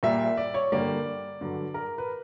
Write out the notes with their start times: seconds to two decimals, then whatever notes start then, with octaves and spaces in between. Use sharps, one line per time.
0.03 A#2 G3 A#3 E5
0.37 D5
0.54 C#5
0.72 G2 D3 G3 A#3 D5
1.41 G2 D3 F#3
1.74 A#4
1.98 B4